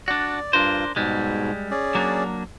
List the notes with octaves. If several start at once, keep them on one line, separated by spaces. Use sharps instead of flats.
D4 F#4 D5
G2 D4 F4 A#4 C5
G#2 B2 G3 G#3
C#4 G#4 D5
F#3 A#3 D4